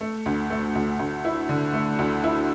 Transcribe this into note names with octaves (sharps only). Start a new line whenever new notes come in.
A3
D2
A3
D2
D2
E4
D3
A3
D2
E4